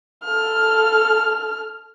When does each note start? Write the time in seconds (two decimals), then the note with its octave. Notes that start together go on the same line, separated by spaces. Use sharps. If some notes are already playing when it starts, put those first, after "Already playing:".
0.24 A4 F6